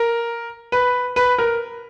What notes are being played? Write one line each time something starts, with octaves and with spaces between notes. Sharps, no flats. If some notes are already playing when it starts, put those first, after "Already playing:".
Already playing: A#4
B4
B4
A#4